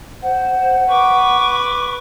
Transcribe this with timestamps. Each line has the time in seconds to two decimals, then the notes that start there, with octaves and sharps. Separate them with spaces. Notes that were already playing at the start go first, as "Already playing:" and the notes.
0.22 C5 F#5
0.89 B4 C#6 D6